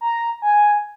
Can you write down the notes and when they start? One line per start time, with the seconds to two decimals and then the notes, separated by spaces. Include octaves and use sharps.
0.01 A#5
0.42 G#5